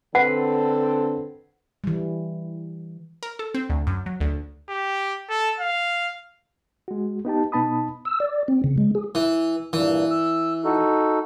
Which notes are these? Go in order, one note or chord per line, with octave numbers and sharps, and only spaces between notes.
D3 C4 A4 B4 F#5
E3 G3
A#4
A4
C4
D2
F#2
F#3
D2
G4
A4
F5
G#3 F#4
B3 D#4 G4 A5
B2 B3 D#4 A5 B5 D#6
E6
D5
C4
C#3
G#3
G#4
E3
G2 A#2 E3
E6
D#4 F#4 A4